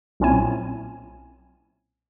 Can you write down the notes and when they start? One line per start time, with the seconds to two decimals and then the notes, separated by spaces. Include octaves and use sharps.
0.20 B1 A#2 C4 C#4 E4 G#5